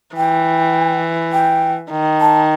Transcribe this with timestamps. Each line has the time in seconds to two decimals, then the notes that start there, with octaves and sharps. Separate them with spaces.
0.16 E3 G5
1.32 G5
1.91 D#3
2.20 A5